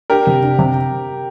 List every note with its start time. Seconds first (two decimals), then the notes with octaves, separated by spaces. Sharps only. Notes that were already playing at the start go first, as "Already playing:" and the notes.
0.10 D4 G4 A#4
0.27 C3
0.43 D4
0.59 C3